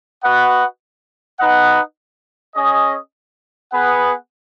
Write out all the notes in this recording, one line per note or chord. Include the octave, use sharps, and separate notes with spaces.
F#4 B4 D#5 F#5
D#4 B4 D#5 F#5
C#4 G#4 D#5
B3 G#4 B4 F#5